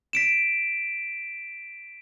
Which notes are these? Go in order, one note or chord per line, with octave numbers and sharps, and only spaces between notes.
B6 D7 E7